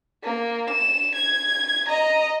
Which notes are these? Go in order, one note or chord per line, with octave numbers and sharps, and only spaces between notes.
A#3
E7
G#6
D#5 A#5